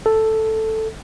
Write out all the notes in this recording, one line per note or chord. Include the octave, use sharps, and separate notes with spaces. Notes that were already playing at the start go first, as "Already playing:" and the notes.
A4